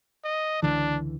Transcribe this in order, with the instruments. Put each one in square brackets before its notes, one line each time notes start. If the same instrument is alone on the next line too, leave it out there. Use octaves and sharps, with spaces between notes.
[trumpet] D#5
[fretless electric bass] C#2 D3 E3 [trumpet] D4